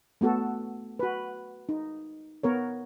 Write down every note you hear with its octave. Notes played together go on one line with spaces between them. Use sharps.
A3 B3 F#4 A4
F#4 B4
D#4
B3 A#4 C#5